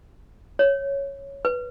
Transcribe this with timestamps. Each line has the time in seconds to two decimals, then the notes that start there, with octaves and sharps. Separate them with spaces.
0.59 C#5
1.45 B4